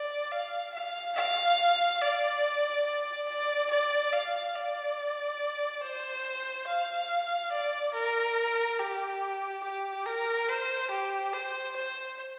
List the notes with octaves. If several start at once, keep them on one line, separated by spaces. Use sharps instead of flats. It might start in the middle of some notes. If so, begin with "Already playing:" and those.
Already playing: D5
F5
F5
F5
D5
D5
D5
D5
F5
D5
C5
F5
D5
A#4
G4
G4
A#4
C5
G4
C5
C5